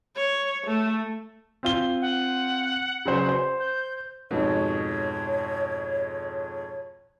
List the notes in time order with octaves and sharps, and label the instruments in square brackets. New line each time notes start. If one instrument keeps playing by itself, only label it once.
[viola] C#5
A3
[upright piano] C4 F4 G7
[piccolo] F#5
[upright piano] C#3 F#3 C5
C5
[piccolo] G6
[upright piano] F2 G#2 B2 [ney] C#5